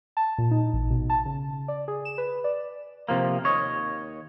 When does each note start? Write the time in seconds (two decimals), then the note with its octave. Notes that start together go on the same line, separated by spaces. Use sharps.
0.17 A5
0.38 A#2
0.51 D#4
0.73 A1
0.90 B2
1.10 A5
1.26 C#3
1.68 D5
1.88 G#4
2.05 E7
2.18 B4
2.44 D5
3.09 C3 F3 A#3
3.44 D#2 C#5 D#5